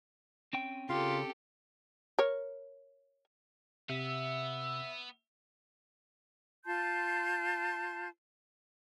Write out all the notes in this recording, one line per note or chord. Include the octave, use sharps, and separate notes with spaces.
C4 C#4 G5
C#3 F4 G4 A4
A#4 C#5
C3 B3 E5
F4 A5 C6 G6